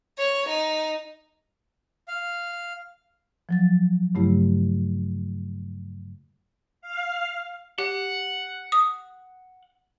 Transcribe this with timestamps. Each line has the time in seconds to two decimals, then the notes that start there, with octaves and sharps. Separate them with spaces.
0.18 C#5
0.49 D#4
2.08 F5
3.49 F3 F#3 A6
4.15 G2 C#3 F#3 A3 E4 G4
6.81 F5
7.78 G4 F#5
8.72 D#6